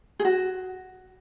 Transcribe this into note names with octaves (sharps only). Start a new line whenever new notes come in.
G#4
F#4